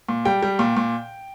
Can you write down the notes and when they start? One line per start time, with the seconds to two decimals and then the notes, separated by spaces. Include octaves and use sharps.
0.09 A#2
0.25 G3 G5
0.43 G3
0.59 A#2
0.77 A#2